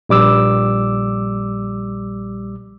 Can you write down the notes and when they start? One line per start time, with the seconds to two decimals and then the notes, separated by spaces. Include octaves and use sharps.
0.09 A#1 G3 D6 E6